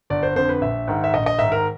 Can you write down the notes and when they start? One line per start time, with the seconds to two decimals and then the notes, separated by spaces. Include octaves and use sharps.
0.10 G1 D5
0.23 C5
0.36 F2 D3 C5
0.49 B4
0.61 A#1 E5
0.88 G#2 D#3
1.04 E5
1.14 A#1 D#5
1.26 D#5
1.39 G#2 D#3 E5
1.52 A#4